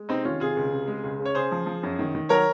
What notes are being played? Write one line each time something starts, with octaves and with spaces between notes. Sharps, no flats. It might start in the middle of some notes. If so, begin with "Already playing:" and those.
Already playing: G#3
C3 C4 D#4
D#3 C#4 F4
C3 F4 G#4
C#2
C3
G#3
C#2
C#3
C#5
C#3 G#4 C5
F3
F3
F#2
D#3
D#3
F#3 A#4 C#5